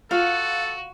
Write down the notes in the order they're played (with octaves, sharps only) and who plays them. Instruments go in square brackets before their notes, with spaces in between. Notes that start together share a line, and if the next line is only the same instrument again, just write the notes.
[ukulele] F4 [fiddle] F#4 [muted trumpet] A4 [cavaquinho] F5 F#5